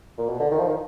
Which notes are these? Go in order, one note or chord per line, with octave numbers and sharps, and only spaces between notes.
A#2
B2
D3
D#3
F3
D#3